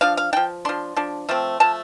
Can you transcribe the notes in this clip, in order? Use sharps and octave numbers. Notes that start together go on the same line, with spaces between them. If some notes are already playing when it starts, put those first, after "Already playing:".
F3 D4 F5
F5
F3 D4 G5
F3 D4 C6
F3 D4
F3 A3 C4
F3 A3 A5